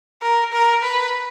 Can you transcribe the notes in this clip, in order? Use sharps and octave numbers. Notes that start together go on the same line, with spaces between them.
A#4
A#4
B4